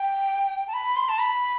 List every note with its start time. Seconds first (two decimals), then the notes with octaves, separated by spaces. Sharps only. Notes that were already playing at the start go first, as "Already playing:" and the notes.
Already playing: G5
0.67 A5
0.73 B5
0.96 C6
1.08 A5
1.19 B5